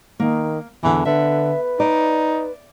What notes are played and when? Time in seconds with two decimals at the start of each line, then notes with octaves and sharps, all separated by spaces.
0.20 D#3 A#3
0.83 E2 D3 E3 E5
1.05 D3 B4 E5
1.80 D#4 D5